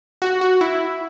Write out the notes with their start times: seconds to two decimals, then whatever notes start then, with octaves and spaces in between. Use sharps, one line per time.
0.22 F#4
0.41 F#4
0.61 E4